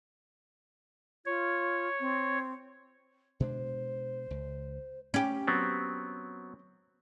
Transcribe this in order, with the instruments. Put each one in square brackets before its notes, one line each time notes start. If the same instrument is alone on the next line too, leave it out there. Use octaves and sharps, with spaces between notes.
[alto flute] F4 [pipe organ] C#5
[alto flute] C4
[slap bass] B2 G#3 D4 [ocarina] C5
[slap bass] C#2
[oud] C#4 G4
[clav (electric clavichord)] F#3 B3 C4